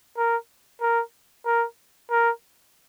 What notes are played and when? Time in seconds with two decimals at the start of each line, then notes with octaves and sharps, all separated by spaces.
0.17 A#4
0.82 A#4
1.46 A#4
2.11 A#4